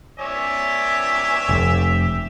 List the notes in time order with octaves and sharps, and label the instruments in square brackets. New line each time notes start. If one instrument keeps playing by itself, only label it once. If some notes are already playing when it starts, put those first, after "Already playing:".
[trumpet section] G4 E5 [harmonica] C#5 D5 G#5
[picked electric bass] F1